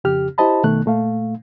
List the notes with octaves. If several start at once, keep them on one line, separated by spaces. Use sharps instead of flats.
F2 C#3 G4 F6
E4 G4 C5 D#5 A5 B5
B2 D#3 A3 F#6
A#2 A3 F5